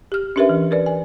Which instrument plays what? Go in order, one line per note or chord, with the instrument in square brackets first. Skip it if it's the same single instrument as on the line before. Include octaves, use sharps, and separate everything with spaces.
[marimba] G4 F6
C#4 D4 G4 A#4 B4 E5
E3
A#4 B4 D5
G#5